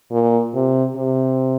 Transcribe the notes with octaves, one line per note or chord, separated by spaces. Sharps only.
A#2
C3
C3